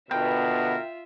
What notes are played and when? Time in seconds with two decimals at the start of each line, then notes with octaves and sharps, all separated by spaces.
0.11 B2 D3 B3 F4 A#4 E5 G5